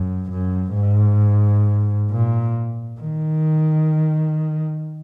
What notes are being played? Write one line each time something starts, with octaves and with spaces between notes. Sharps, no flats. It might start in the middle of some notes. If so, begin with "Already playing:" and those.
Already playing: F#2
F#2
G#2
A#2
D#3